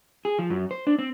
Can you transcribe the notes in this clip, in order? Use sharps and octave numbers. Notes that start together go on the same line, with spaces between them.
G#4
F3
F#2
C5
D4
C4